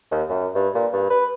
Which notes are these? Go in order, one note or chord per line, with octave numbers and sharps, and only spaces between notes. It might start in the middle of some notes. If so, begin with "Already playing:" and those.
D#2
F#2
G2
A#2
G2
B4